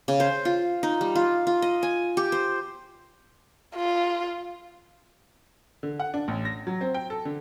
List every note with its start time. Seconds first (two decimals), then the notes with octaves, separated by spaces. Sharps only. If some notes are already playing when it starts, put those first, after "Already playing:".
0.08 C#3
0.20 C5
0.45 F4
0.83 D#4
1.01 G3
1.16 F4
1.47 F4
1.62 D#5
1.83 G#5
2.17 G4
2.32 C5
3.76 F4
5.83 D3
6.00 F#5
6.14 D4
6.28 A1
6.45 A#6
6.67 F#3
6.81 C4
6.94 G5
7.10 A4
7.25 D3